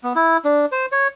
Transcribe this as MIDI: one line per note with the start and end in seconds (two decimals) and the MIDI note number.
0.03 0.13 59
0.16 0.37 64
0.45 0.66 62
0.72 0.86 72
0.92 1.08 73